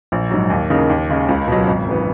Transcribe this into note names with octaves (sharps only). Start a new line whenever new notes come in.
A#1
G#2 F#3
D#2
C#3 E3 A#3 D#4
D#2
C#3 G#3
C#2
B2 F#3
G#1
F#2 E3 B3